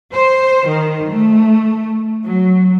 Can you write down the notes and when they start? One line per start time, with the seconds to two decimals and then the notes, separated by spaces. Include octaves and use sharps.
0.11 C5
0.68 D#3
1.10 A3
2.23 F#3